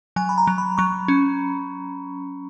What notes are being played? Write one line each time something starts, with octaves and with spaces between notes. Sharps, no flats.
F#3 G#5
B5
A#5
F#3
B5
F#3 C#6
C#4